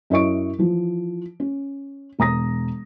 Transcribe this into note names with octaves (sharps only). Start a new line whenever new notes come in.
F#2 E4 D#5 C#6 D7
E3 F3
C#4
E1 A#5 D#6 A#6